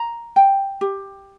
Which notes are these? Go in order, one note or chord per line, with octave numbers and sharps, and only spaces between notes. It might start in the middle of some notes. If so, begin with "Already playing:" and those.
Already playing: A#5
G5
G4